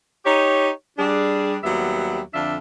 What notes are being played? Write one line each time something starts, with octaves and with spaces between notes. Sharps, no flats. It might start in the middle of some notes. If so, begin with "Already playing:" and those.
D#4 G4 C#5
G3 D4 G#4
D#2 F#3 G3 B3 G4 E5
F2 D3 F3 D4 F4 E5